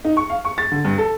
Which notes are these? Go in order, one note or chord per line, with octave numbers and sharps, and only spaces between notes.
D#4
C#6
F5
C#6
A6
D3
G2
A4